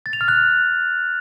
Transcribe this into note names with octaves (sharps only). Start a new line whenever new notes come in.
A6
F7
F6
F#6